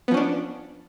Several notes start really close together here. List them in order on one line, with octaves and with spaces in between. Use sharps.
B3 F3 C#4 D4